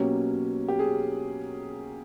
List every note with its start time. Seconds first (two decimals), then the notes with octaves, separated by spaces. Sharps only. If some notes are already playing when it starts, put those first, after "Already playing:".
Already playing: B2 F#3 A#3 C#4 G4
0.68 G4
0.79 G#4